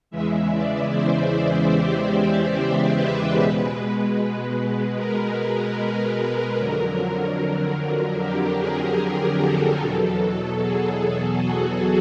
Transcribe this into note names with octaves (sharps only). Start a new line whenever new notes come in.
E2 C#3 E3 G#3 E5
D5
C5
G4
C5
B4
B2 G#3 B4
A#4
F2 D3 F#3
G4
G#4
A4
E2 B2 F#3
G#4
F#4